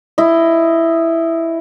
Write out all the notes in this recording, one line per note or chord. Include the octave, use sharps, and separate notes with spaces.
E4 D#5